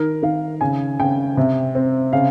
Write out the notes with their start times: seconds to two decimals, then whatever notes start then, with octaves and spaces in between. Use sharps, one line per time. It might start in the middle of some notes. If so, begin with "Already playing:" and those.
Already playing: D#3 A#4
0.23 D#3 F5
0.61 C#3 G#5
0.99 C#3 G5
1.37 C3
1.75 C4
2.13 C#3 F5